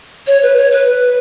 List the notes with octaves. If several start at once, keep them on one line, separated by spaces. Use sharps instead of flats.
C#5
B4
C#5
B4